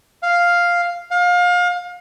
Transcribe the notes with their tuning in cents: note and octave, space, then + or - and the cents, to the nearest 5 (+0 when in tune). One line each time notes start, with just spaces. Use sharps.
F5 +0
F5 +30